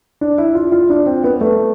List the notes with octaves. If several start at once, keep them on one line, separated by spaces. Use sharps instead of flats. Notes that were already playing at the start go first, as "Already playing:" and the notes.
D4
E4
F4
F4
D4
C4
B3
A3